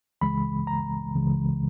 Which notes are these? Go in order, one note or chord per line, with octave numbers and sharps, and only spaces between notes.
C#2 C#3 E3 G#3 B5
A#5
C#2 C#3 E3 G#3